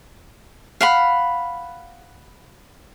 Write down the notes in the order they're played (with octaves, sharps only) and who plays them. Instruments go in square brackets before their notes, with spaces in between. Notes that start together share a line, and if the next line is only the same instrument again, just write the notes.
[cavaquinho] F5 F#5 B5